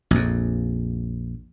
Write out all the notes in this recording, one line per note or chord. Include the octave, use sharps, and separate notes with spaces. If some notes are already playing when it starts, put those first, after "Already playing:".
A#1 F2